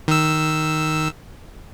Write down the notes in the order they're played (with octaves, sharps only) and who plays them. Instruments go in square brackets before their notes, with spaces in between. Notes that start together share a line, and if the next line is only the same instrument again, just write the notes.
[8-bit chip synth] D#3 E6